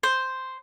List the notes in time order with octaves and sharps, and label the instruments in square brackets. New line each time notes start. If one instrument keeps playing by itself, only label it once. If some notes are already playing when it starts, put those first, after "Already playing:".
[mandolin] C5